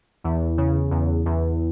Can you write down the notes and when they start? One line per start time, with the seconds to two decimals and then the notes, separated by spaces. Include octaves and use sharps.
0.24 E2
0.58 C#3
0.91 E2
1.26 E2